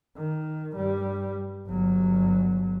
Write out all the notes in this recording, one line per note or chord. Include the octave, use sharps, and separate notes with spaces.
D#3
G2 G3
G1 F#3